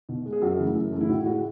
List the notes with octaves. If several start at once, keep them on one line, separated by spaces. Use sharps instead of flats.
B2
G#3
G#4
F#2 F#4
C#3 E3 A3
F#2
C#3 E3 A3
E4
A2 F#4
G#3 F#4